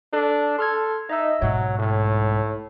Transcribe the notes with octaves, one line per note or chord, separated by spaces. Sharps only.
D4 A4
A4 C6 F6 G#6
D#4 D#5 E5 E6
B1 G#2 F#3 C#5
A2